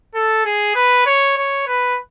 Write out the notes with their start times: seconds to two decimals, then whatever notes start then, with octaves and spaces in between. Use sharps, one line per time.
0.15 A4
0.45 G#4
0.75 B4
1.06 C#5
1.37 C#5
1.67 B4